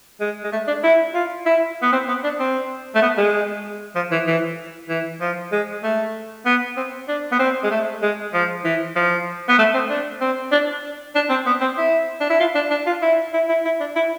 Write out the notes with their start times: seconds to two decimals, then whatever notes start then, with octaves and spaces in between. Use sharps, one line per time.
0.21 G#3
0.44 G#3
0.52 A3
0.67 D4
0.83 E4
1.14 F4
1.45 E4
1.82 B3
1.92 C4
2.08 B3
2.24 D4
2.40 C4
2.95 A3
3.02 B3
3.17 G#3
3.95 F3
4.12 E3
4.27 E3
4.89 E3
5.21 F3
5.52 G#3
5.83 A3
6.46 B3
6.77 C4
7.08 D4
7.32 B3
7.39 C4
7.63 G#3
7.71 A3
8.02 G#3
8.34 F3
8.64 E3
8.96 F3
9.48 B3
9.58 A3
9.74 C4
9.89 D4
10.21 C4
10.52 D4
11.15 D4
11.30 C4
11.46 B3
11.61 C4
11.77 E4
12.20 D4
12.30 E4
12.40 F4
12.55 D4
12.71 D4
12.86 F4
13.02 E4
13.33 E4
13.49 E4
13.65 E4
13.80 D4
13.96 E4